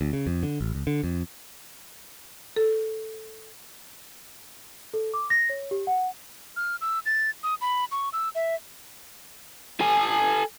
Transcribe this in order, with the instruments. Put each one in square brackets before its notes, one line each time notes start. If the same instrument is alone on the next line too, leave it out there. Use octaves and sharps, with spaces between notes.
[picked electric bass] D2
C#3
F2
D3
A1
C#2
D3
F2
[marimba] A4
[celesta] A4
D6
A#6
C#5
G4
F#5
[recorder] F6
E6
A6
D#6
B5
C#6
E6
E5
[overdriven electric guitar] A4 G#5